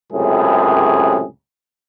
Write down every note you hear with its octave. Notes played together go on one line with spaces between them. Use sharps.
C#2 F#2 A2 C3 G#4